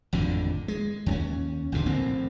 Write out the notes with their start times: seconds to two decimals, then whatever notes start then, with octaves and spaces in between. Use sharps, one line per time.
0.13 G#1 F2 A2 D3
0.68 G#3
1.06 D#2 B3 C#4
1.72 A1 G#2 B2 D3
1.86 A#1 A2 A#3 C4